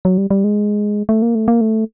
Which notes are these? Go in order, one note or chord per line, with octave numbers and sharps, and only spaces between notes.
F#3
G3
G3
G#3
A3
A#3
A3
A#3
A3